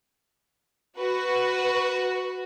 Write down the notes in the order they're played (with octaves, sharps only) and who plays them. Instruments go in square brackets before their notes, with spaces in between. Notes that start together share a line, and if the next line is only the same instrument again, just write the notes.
[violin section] F#4 [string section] B4